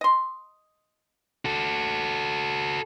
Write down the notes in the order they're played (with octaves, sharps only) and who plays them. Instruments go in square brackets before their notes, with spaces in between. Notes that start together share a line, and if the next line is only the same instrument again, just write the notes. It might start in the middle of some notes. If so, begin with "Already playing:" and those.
[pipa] D#5 C6
[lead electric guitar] F#4 A4